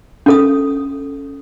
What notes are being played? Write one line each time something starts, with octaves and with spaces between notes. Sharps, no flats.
C#4 A4 D#6